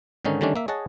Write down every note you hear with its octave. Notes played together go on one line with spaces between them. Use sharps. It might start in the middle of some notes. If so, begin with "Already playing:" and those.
G#2 D3 D#3 C#4 D#4
D3 D#3 G3 A3 C#4 D4
A#3 E5
G#4 C#5 D#5 F#5 A5